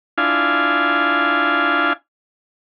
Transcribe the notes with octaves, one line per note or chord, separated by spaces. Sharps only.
D4 E4 F4 F5 G#5